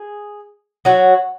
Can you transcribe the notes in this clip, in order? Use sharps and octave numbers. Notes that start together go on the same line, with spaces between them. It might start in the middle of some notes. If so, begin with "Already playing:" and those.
Already playing: G#4
F#3 F#4